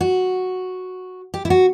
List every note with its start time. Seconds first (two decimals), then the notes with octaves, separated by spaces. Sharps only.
0.01 F#4
1.34 G4
1.45 E4
1.50 F#4